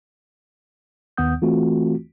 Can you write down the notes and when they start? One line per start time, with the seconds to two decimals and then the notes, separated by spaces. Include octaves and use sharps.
1.17 D#2 D#3 B3 F#5 D#6 G6
1.42 E3 A3 C4 F4 F#4